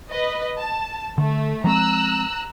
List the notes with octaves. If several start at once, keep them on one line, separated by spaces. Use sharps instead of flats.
B4 D#5
A5
D3 A3
F3 G#3 C4 A#5 E6 F#6